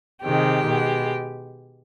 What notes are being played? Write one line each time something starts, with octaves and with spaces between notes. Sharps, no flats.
C3 D#3 G#3 G4
B2 G#3